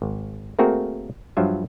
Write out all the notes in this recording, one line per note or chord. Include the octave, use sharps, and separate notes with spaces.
G#1
A3 A#3 C4 F#4 G#4 A#4
G2 F3 F#3 F4 E5